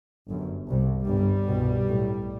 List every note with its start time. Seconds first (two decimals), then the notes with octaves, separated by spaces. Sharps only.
0.29 G1 F#2
0.69 C2 C3
1.07 G1 G2 G3
1.47 C2 B2
1.86 B1 A2